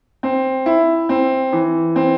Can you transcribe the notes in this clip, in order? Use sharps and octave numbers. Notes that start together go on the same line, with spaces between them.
C4
E4
C4
E3
C4